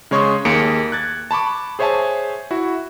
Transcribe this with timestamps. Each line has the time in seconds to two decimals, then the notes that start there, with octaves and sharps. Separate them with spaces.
0.11 C#3 G#3 C#5 C6 C#6 D#6
0.45 D#2 A#3 G#4 C#7 D7
0.92 F#6 G#6 A6
1.31 A5 B5 C#6 D6
1.79 G#4 C5 C#5 E5 G#5 A5
2.51 E4 F#4